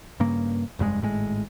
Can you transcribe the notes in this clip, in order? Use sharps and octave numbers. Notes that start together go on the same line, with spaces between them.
G2 C#3 A#3
F1 G2 B2 G#3
G#1 A2 C3 G#3